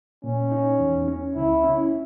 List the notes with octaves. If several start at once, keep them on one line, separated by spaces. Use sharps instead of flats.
A#2 C#4
D#4
E2
C#4
C#2 E4
C#4